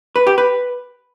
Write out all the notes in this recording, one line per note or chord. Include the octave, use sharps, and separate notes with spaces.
B4
G4
B4